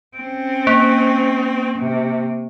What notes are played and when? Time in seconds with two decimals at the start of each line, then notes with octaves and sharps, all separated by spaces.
0.17 C4 C#4
0.67 A#3
1.79 C3